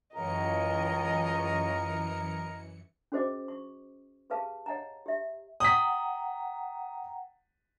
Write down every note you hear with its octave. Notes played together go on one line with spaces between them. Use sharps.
C#2 F#2 E3 A#4 D#5 C#7
C#4 F#4 G#4 C5 D#5 D6
C#6
G4 G#4 B4 F5 A5
C#5 D#5 F#5 G#5 A#5
G4 E5
F#5 G5 A#5 D#6 B6